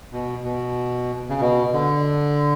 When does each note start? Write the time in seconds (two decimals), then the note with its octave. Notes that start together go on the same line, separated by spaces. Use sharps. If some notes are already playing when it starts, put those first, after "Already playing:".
0.12 B2
0.44 B2
1.30 C#3
1.41 B2
1.73 D3